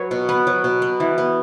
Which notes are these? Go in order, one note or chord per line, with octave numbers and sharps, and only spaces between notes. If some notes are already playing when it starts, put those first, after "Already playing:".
Already playing: F#3 B4 C#5
B2
B3 B4
F#3
B2
B3
E3
B3